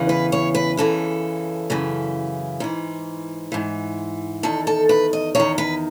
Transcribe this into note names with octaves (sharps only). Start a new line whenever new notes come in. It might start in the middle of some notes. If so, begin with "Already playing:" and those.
Already playing: E2 C#3 E3
B4
C#5
B4
F#2 C#3 E3 A4
F#2 C#3 E3
G#2 E3
G#2 E3
E2 D#3 A4
A4
B4
D#5
E2 D#3 C#5
B4